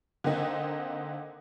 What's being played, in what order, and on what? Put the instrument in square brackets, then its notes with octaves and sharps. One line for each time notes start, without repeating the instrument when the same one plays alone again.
[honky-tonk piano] D3 A#3 C4 D#4